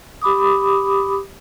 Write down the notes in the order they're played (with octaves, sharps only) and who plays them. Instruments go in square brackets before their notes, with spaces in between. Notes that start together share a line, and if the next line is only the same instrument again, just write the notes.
[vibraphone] G4 B5 D6 D#6